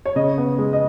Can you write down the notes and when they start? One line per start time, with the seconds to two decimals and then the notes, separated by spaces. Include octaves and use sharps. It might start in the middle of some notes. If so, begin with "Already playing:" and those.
0.06 C#5
0.16 C#3 D#5
0.38 B3
0.58 G#3
0.73 D#5